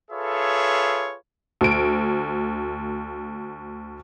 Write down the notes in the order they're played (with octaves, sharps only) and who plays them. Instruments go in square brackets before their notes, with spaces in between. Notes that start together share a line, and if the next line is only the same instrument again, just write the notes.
[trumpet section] F4 G#4 A4 B4 C#5 E5
[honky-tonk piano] D2 D7